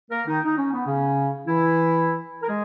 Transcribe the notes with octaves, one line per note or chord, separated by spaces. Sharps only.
A#3 A#4
D#3 D#4
D#4
C#4
B3
C#3 C#4
E3 E4
A#4
G#3 G#4